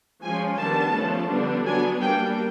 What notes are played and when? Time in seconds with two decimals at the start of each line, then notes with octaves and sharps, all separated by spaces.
0.22 F3 G#3 C#4 G#5
0.59 D#3 G3 B3 D4 A5
0.94 F3 A3 C#4
1.29 D3 G3 B3 D4
1.65 F#3 B3 D4 G#5
2.01 G3 A#3 D4 G5